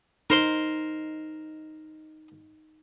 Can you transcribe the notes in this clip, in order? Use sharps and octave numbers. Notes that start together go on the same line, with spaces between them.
D#4 A#4 C5 C6